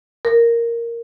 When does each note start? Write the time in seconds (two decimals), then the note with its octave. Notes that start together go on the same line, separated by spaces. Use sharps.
0.25 A#4